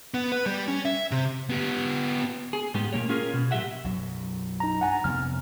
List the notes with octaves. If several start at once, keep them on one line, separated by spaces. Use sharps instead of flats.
B3
B4
G3
C#4
E5
C3
B3 G4
G#4
G#2 G3 B3 G4
A#2 D#3 A#3 C#5
C#4 F4 G#4 A#4
B2
A#2 F#3 G4 D#5 E5 F#5
B1 F#2 F#3
D#4 A#5
G2 F#5 G#5 A#5
F2 C3 B3 F6